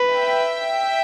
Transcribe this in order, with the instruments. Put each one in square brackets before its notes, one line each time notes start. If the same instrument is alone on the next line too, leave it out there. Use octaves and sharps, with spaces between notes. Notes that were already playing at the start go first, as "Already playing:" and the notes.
Already playing: [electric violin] B4
[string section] E5 G5